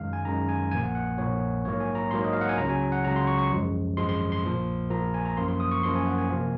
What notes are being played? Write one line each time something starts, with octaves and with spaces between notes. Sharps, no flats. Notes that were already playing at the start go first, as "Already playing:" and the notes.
Already playing: F#2 D#3 G#3 F5
G#5
F#2 D#3 G#3 A#5
G#5
A#1 A#2 F3 A#3 G#5
F#5
F#5
A#1 A#2 F3 A#3 C#5
G#2 F#3 A#3 C#5
G#5
A#5
G#2 F#3 A#3 C6
D#5
F5
F#5
G#5
C#2 C#3 F#3 A#5
G#5
F#5
C#2 C#3 F#3 A#5
C6
C#6
C#6
G#1 F#2 F3 G#3
G#1 F#2 F3 G#3 C6
C6
C6
A#1 A#2 F3 A#3
A#1 A#2 F3 A#3 A#5
G#5
A#5
F#2 F3 A#3 C6
C6
D#6
C#6
F#2 F3 A#3 C6
G#5
F#5
G#5
C3 F3 A#3